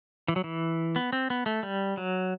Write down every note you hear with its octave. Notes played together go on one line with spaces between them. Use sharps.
E3
F#3
E3
B3
C4
B3
A3
G3
F#3